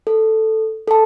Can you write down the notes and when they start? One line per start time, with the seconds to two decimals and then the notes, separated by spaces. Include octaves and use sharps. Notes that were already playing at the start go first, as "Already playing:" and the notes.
0.07 A4
0.88 A4 A5